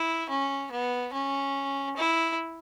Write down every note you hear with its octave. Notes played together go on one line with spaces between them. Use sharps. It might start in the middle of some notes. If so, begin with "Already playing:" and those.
Already playing: E4
C#4
B3
C#4
E4